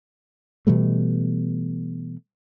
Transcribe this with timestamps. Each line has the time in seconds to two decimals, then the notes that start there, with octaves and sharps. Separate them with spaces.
0.67 B2 E3 G3 A3